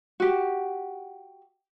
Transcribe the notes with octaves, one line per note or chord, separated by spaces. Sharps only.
F#4 G4